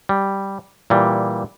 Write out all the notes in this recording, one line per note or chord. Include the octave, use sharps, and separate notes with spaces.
G3
A#2 E3 G3